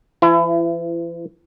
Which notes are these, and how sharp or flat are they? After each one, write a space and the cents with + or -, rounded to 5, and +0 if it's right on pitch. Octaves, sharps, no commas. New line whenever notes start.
E3 +45 E4 +30